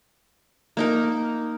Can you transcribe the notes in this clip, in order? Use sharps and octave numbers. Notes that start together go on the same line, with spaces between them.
A#3 D#4 A#4